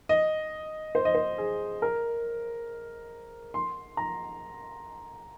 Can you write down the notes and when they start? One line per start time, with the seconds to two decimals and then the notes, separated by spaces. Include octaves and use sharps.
0.09 D#5
0.95 C5
1.05 D#5
1.15 C5
1.38 G#4
1.82 A#4
3.54 C6
3.97 A#5